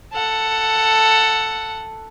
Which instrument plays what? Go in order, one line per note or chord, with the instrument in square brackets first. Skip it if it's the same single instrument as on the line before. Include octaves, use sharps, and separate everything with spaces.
[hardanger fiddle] A4 F#5